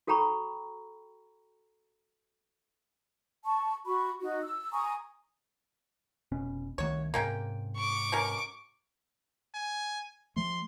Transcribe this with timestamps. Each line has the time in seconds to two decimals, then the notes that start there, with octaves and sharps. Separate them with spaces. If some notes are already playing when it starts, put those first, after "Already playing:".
0.07 F#4 A4 G5 A#5 B5 C#6
3.44 A5 C#6
3.86 F#4 B5 C#6
4.21 D#4 F#4
4.42 E6
4.73 G#5 A#5 C#6 D#6
6.32 F1 B2 C#4
6.78 C2 D#3 A3 F#4 C#5
7.14 G#2 C3 A#3 C#4 G5
7.76 C#6 D6
8.12 B2 C#4 A#4
9.54 G#5
10.36 F3 A3 C6